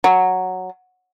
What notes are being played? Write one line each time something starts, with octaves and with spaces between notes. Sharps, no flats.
F#3